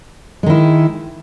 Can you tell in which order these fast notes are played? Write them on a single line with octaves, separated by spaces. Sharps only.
G#3 D#3 E4